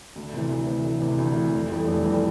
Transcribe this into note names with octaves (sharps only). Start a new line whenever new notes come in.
D2
C3 E3
D2
C3 E3
D2
C3 E3
D2
C3 E3
F1
F2 E3 G3
F1
F2 E3 G3